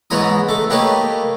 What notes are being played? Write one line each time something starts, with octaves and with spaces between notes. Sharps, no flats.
G#2 E3 B3 C#5 A#5 D#6
A3 A4 D6
A3 A#3 G4 B4 C#5 D#5